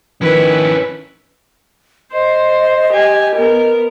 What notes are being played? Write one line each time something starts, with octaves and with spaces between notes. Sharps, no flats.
D#3 F3 C#4 E4 B4
C5 D#5
G4 G#5
B3 A#4